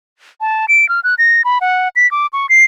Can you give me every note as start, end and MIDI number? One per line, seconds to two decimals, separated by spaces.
0.41 0.66 81
0.68 0.88 98
0.89 1.00 89
1.04 1.15 90
1.18 1.42 94
1.45 1.59 83
1.61 1.89 78
1.96 2.09 95
2.11 2.27 86
2.33 2.46 85
2.49 2.65 96